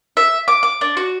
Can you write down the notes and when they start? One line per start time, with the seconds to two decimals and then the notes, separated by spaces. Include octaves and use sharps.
0.17 E5
0.48 D6
0.63 D6
0.81 D4
0.97 F#4